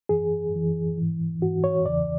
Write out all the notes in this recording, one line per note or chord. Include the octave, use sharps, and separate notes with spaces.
F#2 E3 G#4
F#2 E3
G#2 E3
G#2 E3 F#4
C#5
E2 C#3 E3 D5